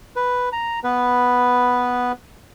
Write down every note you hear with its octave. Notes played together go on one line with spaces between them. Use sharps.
B4
A#5
B3 B4